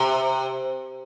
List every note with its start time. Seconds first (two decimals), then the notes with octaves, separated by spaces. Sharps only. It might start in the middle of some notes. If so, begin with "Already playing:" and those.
Already playing: C3